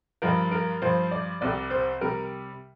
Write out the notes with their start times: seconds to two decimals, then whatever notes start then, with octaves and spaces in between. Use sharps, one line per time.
0.22 G2 F3 A#4
0.51 A#4
0.82 G2 F3 C5
1.11 D5
1.41 C2 C3 G3 D5
1.70 C5
2.01 C3 G3 A#4